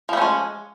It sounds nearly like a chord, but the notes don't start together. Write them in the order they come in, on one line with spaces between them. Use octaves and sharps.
F3 A3 C#4 G#3